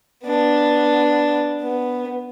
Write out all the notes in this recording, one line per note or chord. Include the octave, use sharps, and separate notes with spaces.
B3 D4
B3